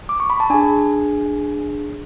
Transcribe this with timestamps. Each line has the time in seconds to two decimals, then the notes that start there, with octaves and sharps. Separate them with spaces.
0.09 D6
0.20 C#6
0.30 B5
0.40 A5
0.50 D4 G#4 G#5